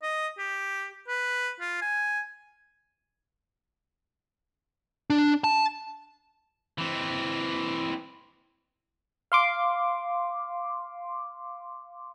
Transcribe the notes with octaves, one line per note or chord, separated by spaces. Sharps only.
D#5
G4
B4
F4
G#5
D4
A5
E3 C4
F5 C6 D6